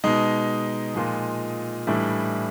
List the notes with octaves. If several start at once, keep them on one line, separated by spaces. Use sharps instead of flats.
B2 G#3 D#4
A#2 F3 G#3
A2 E3 G3 D4 E4